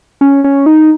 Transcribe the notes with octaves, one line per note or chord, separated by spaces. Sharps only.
C#4
C#4
D#4